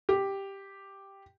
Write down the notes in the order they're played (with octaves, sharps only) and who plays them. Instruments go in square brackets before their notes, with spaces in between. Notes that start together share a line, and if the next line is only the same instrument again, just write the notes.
[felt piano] G4